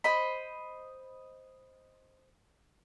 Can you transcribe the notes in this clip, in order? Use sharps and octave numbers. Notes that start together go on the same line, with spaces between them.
C5 D#5 B5